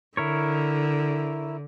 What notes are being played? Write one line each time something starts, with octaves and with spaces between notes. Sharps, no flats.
D3 E4 A#4 C#5